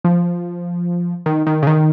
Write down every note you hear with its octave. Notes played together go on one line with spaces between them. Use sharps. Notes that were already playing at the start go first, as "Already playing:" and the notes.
F3
D#3
D#3
C#3
D#3